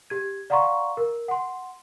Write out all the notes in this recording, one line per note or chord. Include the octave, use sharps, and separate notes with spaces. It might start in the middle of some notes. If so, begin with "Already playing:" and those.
G4 G#6
D5 F5 F#5 A#5 C6 C#6
A#4
F#5 C6